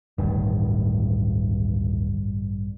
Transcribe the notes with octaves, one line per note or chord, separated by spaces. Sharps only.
D1 A1 G2 D#3